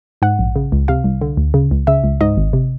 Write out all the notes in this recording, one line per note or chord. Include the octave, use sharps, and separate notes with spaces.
G#2 F#5
A#1
C#3
C#2
C3 F5
C2
D3
D2
C#3
C#2
C#3 E5
C#2
G#2 D#5
G#1
C3